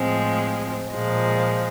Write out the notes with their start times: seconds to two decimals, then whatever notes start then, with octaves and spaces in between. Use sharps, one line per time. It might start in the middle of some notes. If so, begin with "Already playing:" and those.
Already playing: A2 F3 G#3 C4
0.90 A#2 F3 G#3